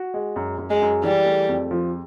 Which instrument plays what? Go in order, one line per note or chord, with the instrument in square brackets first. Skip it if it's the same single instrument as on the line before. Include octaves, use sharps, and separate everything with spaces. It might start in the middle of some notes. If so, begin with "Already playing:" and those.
Already playing: [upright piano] F#4
G#3
F#2
F#2
[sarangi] G#3
[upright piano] F#2
[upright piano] E3 [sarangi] G3
[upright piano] A3
F2
F3